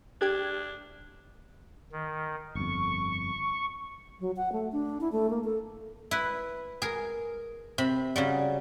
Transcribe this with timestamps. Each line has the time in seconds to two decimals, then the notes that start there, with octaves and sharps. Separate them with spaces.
0.21 D4 G4 G#6
1.92 D#3
2.55 G1 F2 C#6
4.20 F#3
4.37 F#5
4.52 A3
4.72 D4
5.01 E4
5.12 A3
5.30 A#3
5.44 A4
6.11 E4 B4
6.82 G#4 A#4
7.78 C3 B5
8.16 C#3 F#3 G3